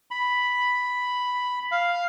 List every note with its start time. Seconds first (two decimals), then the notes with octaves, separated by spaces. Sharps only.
0.11 B5
1.71 F5